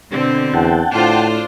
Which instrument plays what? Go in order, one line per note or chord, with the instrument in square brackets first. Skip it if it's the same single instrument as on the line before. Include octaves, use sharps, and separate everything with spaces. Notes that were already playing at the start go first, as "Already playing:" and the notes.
[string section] B2 D3 C4
[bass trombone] E2 [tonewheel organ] F#5 G5 A5
[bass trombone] A2 [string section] D4 F4 C5